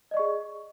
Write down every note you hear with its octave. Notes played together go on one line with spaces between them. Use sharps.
G#4 D5 D#5 C#6